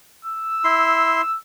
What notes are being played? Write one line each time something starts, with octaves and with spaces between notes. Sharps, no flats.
E6
E4 C6